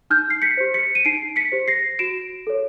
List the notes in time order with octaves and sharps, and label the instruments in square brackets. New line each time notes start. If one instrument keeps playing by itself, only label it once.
[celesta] D#4 F6 G6
C7
B6 C#7
G4 C5
B6 C#7
D#7
D#4 C7 D7
B6 C#7
G4 C5
A#6 C7
F#4 D7 E7
A4 C#5